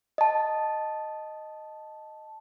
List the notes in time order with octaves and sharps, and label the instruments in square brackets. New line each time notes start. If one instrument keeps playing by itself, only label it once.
[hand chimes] D#5 A5